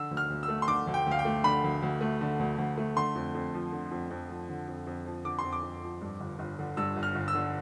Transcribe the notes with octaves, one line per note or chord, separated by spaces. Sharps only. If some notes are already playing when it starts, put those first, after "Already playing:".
Already playing: D3 E6
D2
F6
D2
E6
A3
C6
D3 D6
D2
G5
D2
F5
G5
A3
D3 B5
D2
D2
A3
D3
D2
D2
A3
D3 C6
F2
F2
F3
D3
F2
F2
F3
D3
F2
F2
F3
D3 D6
C6
F2
D6
F2
F3
G2
G1
G1
D3
G2 E6
G1
F6
G1
E6
D3